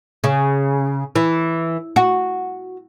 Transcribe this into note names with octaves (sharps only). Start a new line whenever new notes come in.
C#3
E3
F#4